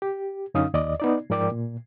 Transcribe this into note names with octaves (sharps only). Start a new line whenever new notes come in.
G4
F#2 D3 C#4 D#4 F5 D#6
D#2 D5 D#5
B3 D#4 D5
G#2 F3 A#4 D5 G5 D6
A#2